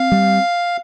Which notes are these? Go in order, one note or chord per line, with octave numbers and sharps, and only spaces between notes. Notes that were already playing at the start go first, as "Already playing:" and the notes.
Already playing: C4 F5
G3